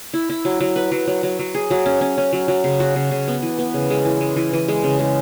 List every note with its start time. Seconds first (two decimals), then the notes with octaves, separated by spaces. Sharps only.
0.14 E4
0.30 E4
0.45 F#3
0.61 F#3
0.76 B4
0.92 F#3
1.07 F#3
1.23 F#3
1.39 F#3
1.55 G#4
1.71 F#3
1.86 C#4
2.01 C#4
2.18 C#4
2.33 F#3
2.48 F#3
2.64 C#3
2.80 F#4
2.96 C#3
3.11 C#3
3.28 B3
3.42 E3
3.59 B3
3.74 C#3
3.90 G#3
4.05 E3
4.21 G#3
4.36 E3
4.53 E3
4.68 G#3
4.84 C#3
4.99 G#3